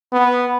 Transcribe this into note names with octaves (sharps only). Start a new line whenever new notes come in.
B3